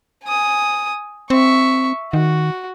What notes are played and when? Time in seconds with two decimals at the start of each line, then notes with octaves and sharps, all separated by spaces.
0.25 G#5 D#6
1.30 C4 E5 C#6
2.13 D#3 F#4